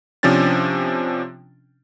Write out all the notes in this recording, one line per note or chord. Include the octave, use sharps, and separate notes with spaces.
C3 F3 C#4 D4 A6